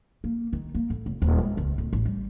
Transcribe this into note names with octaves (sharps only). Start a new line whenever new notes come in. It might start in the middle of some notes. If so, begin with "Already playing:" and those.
A#3
D#3
A#3
A2
F1
D#1
G#3
C#2
D1
A1
G3